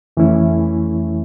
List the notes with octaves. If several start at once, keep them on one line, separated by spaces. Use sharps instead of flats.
F2 E3 A3 C#4 E4